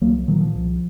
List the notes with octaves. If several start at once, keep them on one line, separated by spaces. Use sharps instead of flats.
C2 F#3 A#3
A#2 D#3 F#3
F3
C2